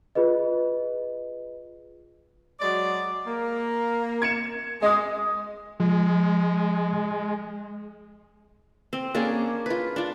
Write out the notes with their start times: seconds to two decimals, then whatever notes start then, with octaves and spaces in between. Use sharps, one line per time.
0.15 F4 G#4 B4 D#5
2.60 F#3 G#3 D5
3.27 A#3
4.22 G#6 C#7 E7
4.82 G#3 D#5 D#6
5.80 F3 G#3
8.93 C4
9.14 A#3 C#4 D4 G#4
9.66 F4 B4
9.96 D4 F4